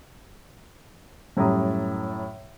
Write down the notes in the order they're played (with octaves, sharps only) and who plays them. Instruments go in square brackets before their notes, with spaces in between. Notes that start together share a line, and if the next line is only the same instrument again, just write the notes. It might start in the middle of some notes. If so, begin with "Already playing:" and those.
[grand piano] F#2 A2 G3 A#5 D#6